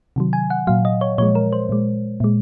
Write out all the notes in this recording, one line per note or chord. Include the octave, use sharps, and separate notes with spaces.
C3 D#3 F#3
G#5
F#5
A#2 F#3 F5
D#5
C#5
A#2 F3 G#3 C#5
A#4
C5
A#2 G#3
A#2 G#3